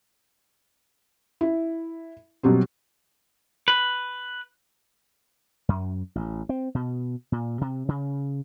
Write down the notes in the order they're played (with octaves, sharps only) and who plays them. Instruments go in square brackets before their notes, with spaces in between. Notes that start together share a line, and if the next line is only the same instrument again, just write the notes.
[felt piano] E4
B2 F#3 G3 C4
[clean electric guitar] B4
[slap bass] F#2
A1
C4
B2
A#2
C3
C#3